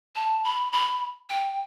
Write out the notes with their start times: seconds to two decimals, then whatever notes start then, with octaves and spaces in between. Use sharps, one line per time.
0.15 A5
0.44 B5
0.73 B5
1.30 G5